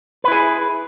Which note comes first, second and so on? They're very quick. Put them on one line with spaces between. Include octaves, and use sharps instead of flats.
B4 E4 G#4